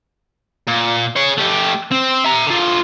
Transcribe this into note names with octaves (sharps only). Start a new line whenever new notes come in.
A#2
G#4 C#5
A3 G4
C4
E5 A#5
D3 F4